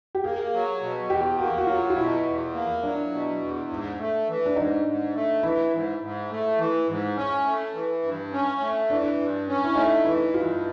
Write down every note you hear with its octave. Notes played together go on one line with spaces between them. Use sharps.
G4
A#3 G#4
F#3
B2
E2 G4
A#3 F#4
F#4
F#3 F4
F4
B2 E4
E2
A#3
F#3 D4
B2
E2
G#2
A3
E3
D4
G#2 D#4
G#2
A3
E3 E4
G#2
G#2
A3
E3
G#2
C#4
A3
E3
G2
C#4
A3
E3 D4
G2
C#4
E4
A3 D#4
E3 E4
G2 F4